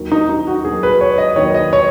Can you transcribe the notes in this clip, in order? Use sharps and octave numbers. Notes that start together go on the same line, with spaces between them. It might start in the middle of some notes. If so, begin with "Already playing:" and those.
Already playing: D#2 D#3 F#3
D#4
D#4
F#4
D#2 D#3 F#3 G#4
B4
C#5
D#5
D#2 D#3 F#3 C#5
D#5
C#5